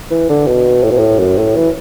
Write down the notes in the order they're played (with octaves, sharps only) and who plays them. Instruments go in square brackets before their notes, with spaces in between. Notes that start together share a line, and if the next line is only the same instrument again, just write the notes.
[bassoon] E3
D3
B2
A2
B2
A2
F#2
A2
E3